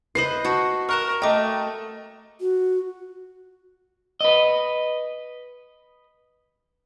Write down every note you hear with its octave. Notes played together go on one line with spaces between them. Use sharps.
B4 C5 D#5 C7 F#7
F#4 A5 C#6 G6
A#4 C#6 F6 F#6 E7
A3 D#5 G5 A#5 D6
F#4
B4 D#5